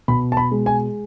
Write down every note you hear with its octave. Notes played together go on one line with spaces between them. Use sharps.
B2 B5
A5
B5
G#3
G#5